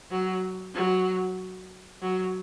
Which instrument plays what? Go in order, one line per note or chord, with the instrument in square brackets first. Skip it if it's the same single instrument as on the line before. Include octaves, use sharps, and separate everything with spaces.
[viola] F#3
F#3
F#3